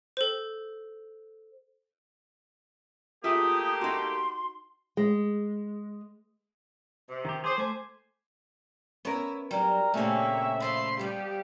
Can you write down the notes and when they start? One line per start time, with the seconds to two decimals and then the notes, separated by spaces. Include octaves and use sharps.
0.17 A4 C5
3.24 A3 A#3 F4 G4 G#4 E5 D#6
3.81 D#4 F#4 C6
4.97 G#3
7.09 C3
7.25 D#3 G4
7.44 G#4 C5 D6 G#6
7.58 A3 C5 G#5
9.05 B3 C#4 E4 A#4 C#5
9.51 F#3 G3 D4 A#4
9.94 A#2 C#3 A3 A#3 C4 C#4 C#5 E5
10.60 B2 F3 F4 B5 C6
10.99 F3 G3 B3 G4